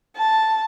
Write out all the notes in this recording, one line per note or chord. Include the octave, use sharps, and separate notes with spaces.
A5